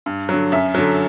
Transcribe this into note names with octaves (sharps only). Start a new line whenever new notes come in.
G2
D3 F#3
F#2 E5
D3 F#3